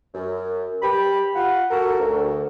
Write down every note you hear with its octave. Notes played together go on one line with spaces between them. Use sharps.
F#2
G4 B5
F4 F#5
F#4 A4 A#4
D2